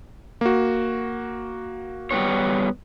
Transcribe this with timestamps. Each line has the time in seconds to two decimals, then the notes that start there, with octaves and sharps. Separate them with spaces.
0.41 A#3 F#4
2.11 G3 B3 C#5